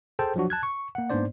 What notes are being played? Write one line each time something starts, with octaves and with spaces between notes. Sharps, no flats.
G#4 A4 C5 G5 A5
F3 F#3 D4 F#4
A5 F#6 G#6
C#6
A#3 F#5
G#2 A#3 B3 D4 C5 D5